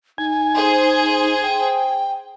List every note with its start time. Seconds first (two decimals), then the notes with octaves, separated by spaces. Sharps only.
0.18 D#4 G#5
0.56 G#4 C5
1.43 G5